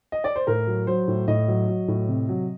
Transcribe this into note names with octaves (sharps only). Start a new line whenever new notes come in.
D#5
D5
C5
A2 A#4
F#3
F#3 C5
A2
A2 D#5
F#3
F#3
A2
C3
F#3